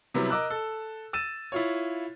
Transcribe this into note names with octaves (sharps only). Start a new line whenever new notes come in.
C3 F#3 G3 B3 E4
A#4 D#5 D6 E6 F#6
A4
E6 A6 D#7 E7
E4 F4 C#5